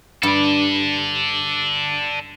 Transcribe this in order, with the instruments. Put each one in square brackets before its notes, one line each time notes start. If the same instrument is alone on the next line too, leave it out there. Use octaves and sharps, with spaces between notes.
[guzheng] G2 [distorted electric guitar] A4 D5